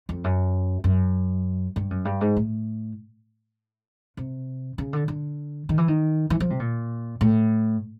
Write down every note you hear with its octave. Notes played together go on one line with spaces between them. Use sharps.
F2
F#2
F#2
G2
F#2
G2
G#2
A2
C3
C#3
D3
D3
D#3
E3
D#3
E3
F3
C3
A#2
A2